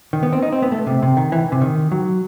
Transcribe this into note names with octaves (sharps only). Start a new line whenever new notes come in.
D#3
B3
C4
D#4
C4
B3
A3
C3
C3
D#3
E3
C3
D#3
F#3